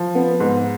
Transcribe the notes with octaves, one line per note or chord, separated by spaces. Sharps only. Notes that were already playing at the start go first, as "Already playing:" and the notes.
Already playing: F3
B3
G#2